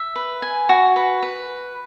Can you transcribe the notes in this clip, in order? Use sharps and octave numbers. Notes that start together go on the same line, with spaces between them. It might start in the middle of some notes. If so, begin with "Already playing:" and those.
Already playing: E5
B4
G#5
F#4
B4
B4